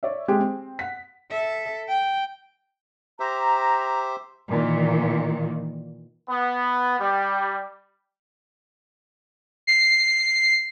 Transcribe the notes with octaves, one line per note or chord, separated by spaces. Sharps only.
C#5 D5 E5
G#3 C4 G4 G#4
C4
F#5 B6
A4 E5
G5
G4 C5 E5 A#5
A#2 D#3 E3
B3
G3
C7